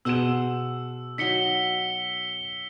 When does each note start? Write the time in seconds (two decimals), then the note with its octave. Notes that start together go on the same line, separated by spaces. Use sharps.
0.05 B2 G#4 C5 F#5 E6 E7
1.18 F#3 D#4 B6 C#7 G7